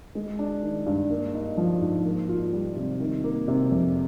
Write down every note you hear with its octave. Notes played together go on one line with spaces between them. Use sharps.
G#3
D4
D#3
G2
A#3
D#4
F3
G#2
A#3
F4
G3
C3
D#3
A#3
C3
F2